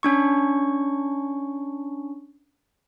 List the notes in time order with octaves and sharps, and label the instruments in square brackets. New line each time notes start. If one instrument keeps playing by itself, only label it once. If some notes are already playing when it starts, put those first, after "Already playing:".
[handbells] C#4 D4 C#6